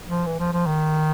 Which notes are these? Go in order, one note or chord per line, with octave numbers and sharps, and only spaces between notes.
F3
E3
F3
F3
D#3